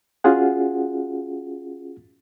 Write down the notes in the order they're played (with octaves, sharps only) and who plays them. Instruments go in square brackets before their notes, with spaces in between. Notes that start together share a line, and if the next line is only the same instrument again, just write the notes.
[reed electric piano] C#4 F4 F#4 G#4 F#5